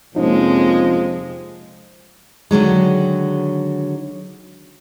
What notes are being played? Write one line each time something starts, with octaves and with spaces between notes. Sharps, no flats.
F2 C3 F3 G#3 A#3 C#4 D#4
D3 D#3 F#3 G#3